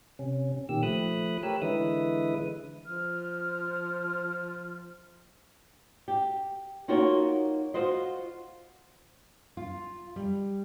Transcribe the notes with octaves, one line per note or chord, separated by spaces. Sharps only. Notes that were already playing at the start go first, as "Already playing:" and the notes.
C3 C#4
A#2 D#3 G4 E6
F3 A3 B5 D#6 F#6
G4 A#4 C#5 B5 E6
D3 E3 G#3 B4 E5 D#6
F3 F6
G4
A#3 D#4 F4 F#4 C#5
F4 F#4 C5 D#5
F4
G3